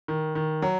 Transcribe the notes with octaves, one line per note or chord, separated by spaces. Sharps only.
D#3
D#3
F#3